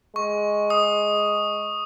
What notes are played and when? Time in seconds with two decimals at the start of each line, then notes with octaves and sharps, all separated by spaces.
0.15 G#3 C#6
0.70 D#6